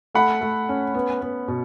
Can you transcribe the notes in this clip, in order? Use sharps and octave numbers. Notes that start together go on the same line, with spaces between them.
A3 F#5 B5
A3
C#4
B3
B3
B2